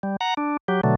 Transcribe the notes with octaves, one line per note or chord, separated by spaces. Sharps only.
G3
F#5 A#5
D4
F#3 G4
B2 D3 F#3 A3